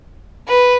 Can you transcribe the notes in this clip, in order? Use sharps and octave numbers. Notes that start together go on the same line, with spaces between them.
B4